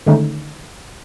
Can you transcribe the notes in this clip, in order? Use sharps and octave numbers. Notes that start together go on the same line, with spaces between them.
D3 D#3 G#3 A3 C#4 D#4